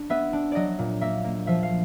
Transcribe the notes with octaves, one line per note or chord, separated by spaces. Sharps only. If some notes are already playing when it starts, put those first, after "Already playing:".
Already playing: D4
B3 E5
D4
F#3 D5 D#5
A#2
A#3 E5
A#3
F3 E5
F5